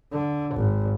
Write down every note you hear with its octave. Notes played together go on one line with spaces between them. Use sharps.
D3
G#1